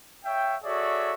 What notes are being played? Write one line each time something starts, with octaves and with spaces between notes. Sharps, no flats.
C#5 E5 F5 G5
F#4 G#4 A4 C#5 D5 E5